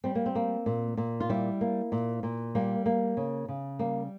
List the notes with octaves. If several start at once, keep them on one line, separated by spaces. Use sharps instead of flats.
G3 C4
A#3
C4
A#3
A#2
A#2
F4
G3 E4
A#3
A#2
A#2
G3 A#3
A#3
C#3
C#3
G3 A#3